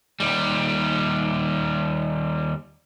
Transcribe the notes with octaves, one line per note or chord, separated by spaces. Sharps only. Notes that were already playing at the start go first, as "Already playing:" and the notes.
D#2 G3